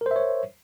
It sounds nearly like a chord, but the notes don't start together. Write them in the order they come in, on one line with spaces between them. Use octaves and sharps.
A#4 C5 E5 C#5